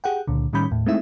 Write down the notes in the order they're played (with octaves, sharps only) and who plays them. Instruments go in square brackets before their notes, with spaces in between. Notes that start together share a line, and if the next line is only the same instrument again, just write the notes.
[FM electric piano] G4 G#4 F#5 G5
C#2 A#2 D3
A2 D#3 G3 C#4 B5 G6
D#2 A2
G#3 A3 C4 D#4 E4 E5